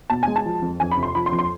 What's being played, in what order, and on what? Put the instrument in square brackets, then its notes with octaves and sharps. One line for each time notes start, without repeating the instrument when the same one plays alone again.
[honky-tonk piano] B2 A5
G#3 G#5
A5
F3
F2
F2 G#5
B5
C3
C6
F3 B5
C6
F2
C6